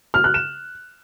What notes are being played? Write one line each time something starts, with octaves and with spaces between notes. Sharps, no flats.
F6
F#6
E7